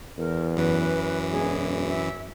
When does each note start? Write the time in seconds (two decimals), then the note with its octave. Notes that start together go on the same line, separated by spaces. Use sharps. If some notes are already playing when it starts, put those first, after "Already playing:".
0.18 E2 A#4
0.56 F#2 E3 B4
1.31 E1 G#4
1.89 E5